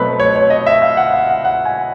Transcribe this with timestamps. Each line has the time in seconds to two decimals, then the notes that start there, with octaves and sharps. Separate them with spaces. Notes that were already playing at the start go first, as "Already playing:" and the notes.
Already playing: B2 F#3 A3 C4 B4
0.20 C#5
0.36 C#5
0.50 D#5
0.66 E5
0.82 F5
0.97 F#5
1.13 F5
1.29 F#5
1.45 F#5
1.65 G#5